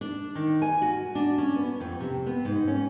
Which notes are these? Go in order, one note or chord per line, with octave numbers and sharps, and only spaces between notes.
D4
D#3
G#5
F#4
D4
C#4
B3
F2
C3
B3
G#2
C#4